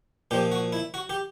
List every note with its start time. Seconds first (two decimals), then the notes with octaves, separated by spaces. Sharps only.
0.31 A#2 F3 G4
0.52 F#4
0.73 E4
0.94 F#4
1.10 G4